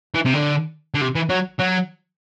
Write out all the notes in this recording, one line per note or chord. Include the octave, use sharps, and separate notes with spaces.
E3
C3
D3
D3
C3
E3
F#3
F#3